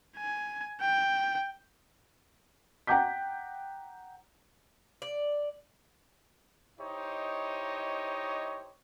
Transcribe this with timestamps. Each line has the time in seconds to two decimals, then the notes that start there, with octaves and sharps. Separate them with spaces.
0.17 G#5
0.81 G5
2.87 F#5 G5 A#5 D6 G6 B6
5.02 D5
6.79 D#4 E4 G4 C5 C#5 D#5